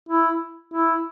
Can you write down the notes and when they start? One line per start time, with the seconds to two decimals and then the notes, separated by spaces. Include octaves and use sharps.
0.09 E4
0.74 E4